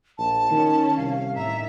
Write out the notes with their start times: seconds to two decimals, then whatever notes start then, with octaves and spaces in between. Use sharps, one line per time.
0.18 A#1 A5
0.51 D#3 C#4
0.97 C2 F5
1.36 A2 D#3 E5 A#5